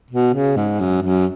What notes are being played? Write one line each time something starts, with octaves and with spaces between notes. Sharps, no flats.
B2
C#3
G#2
F#2
F#2